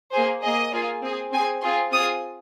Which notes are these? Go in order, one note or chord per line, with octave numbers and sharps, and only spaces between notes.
A#3 G#4 C5
A#3 G#4 D#5
A#3 F4 G#4
C4 G#4
C4 G#5
G#4
C4 F4 G#4 C6
C4 F4 G#4 D#6